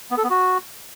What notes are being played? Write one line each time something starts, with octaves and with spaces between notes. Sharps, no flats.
B3
A4
B3
F#4